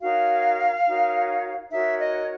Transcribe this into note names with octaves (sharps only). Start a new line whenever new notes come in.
D#4 F#4 A#4 C#5 F5
D#4 F#4 A#4 C#5
D#4 F#4 A#4 C#5 E5
D#5